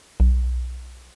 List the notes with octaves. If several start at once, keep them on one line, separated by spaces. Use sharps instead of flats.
B1